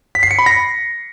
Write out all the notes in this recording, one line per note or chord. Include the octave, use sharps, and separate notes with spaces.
B6
C7
C#7
B5
A#6